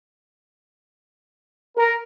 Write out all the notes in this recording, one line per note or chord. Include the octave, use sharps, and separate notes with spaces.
A#4